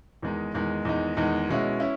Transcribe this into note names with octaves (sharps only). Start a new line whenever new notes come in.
E2 D#3 G#3 D#4
E2 D#3 G#3 D#4
E2 D#3 G#3 D#4
E2 D#3 G#3 D#4
B2 G#3 C#4 E4
C#4 E4